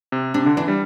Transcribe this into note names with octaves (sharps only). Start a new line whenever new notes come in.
C3
C3 D4
D3
E3 D4
G3